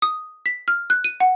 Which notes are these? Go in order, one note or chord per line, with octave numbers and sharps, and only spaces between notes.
D#6
B6
F6
F#6
D#7
F#5